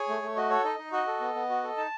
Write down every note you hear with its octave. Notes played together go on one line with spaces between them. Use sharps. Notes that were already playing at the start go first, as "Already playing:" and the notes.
Already playing: G#4 C#5
A3
A3
F#4 D#5
A4 C#5
D#4 D#5
D#4
F#4 D#5
A4
B3
B3
F#4
A4
D#4 A5